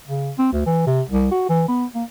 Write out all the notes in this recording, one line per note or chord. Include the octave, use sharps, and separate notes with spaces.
C#3
C4
D2
E3
C3
C2
F#4
E3
B3
A#3